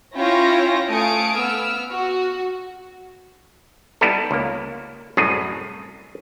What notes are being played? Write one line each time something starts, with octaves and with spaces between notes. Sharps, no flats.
C#4 E4 F4 C#5 G5 A#6
A3 F5 G#5 D#6 C#7 D7
B3 E6 F6
F#4
G3 B3 D#4 E4 A4
C#2 A#3
C2 F#2 A2 G#4 G#5